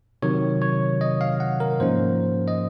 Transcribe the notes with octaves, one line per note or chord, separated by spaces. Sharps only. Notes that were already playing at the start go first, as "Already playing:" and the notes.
C3 D#3 F#3 C#5
C#5
D#5
F5
F#5
A#4
G#2 F3 A#3 C#4 C5
D#5